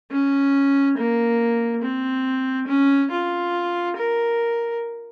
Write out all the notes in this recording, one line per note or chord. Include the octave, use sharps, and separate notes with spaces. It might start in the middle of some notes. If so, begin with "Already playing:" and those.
C#4
A#3
C4
C#4
F4
A#4